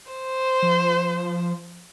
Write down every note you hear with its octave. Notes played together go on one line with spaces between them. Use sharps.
C5
F3